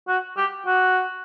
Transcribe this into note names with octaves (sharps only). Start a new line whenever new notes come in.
F#4
G4
F#4